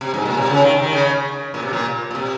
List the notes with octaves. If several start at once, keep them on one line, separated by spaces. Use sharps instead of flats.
C3
G#2
A#2
C3
C#3
D#3
D#3
C#3
A#2
C3
A#2
A#2
C3